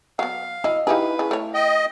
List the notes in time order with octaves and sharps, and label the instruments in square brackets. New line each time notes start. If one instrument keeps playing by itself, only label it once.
[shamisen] F#3 B3 [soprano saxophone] F5
[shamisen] E4 [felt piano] D#5
[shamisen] D#4 G4 G#4 [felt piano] E4 F5 [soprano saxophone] B4
[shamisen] C#3
A3 C#5
[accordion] D#5 [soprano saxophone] G5